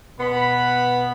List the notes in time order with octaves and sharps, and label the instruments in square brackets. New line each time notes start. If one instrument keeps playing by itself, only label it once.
[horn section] B2 B3 B5